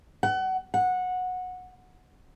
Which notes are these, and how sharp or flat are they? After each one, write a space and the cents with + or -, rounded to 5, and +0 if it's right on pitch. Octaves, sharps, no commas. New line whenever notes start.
F#5 +30
F#5 -15